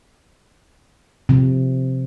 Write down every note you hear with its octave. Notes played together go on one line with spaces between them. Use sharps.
C3 F3